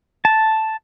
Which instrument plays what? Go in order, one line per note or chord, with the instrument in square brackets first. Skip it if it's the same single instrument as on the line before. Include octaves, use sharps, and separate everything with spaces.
[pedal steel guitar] A5